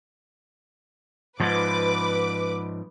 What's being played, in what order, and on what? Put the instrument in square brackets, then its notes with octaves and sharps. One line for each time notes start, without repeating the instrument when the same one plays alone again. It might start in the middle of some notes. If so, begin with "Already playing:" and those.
[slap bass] G#2 F3 [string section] B4 D6